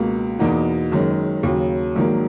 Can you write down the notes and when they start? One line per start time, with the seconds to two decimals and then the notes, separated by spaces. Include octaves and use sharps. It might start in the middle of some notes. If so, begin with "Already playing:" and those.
Already playing: C#2 B2 A#3
0.39 E2 B2 A#3 D#4 F#4
0.91 F#1 F#2 D#3 G#3 C#4
1.43 D#2 C#3 F#3
1.96 A#1 G#2 D#3 F#3 A#3